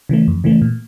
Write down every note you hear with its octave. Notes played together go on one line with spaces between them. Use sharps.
C#3 E3 A3
F2
C#3 E3 A3
A#2